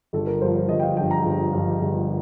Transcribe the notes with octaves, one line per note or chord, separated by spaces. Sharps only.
G1 A4
A#4
G2 F3 C5
C5
G1 D#5
G5
F5
G2 F3 G5
A#5
G1
G2 F3
G1